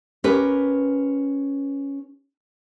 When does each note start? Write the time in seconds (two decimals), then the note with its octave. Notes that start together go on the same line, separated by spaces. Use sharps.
0.24 C#4 G4 A#4 B4